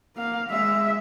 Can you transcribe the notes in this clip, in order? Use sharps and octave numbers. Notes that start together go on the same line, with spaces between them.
A#3 F5
G#3 E5